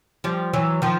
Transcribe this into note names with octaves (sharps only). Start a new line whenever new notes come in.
F3 G3
E3 F#3
D#3 F3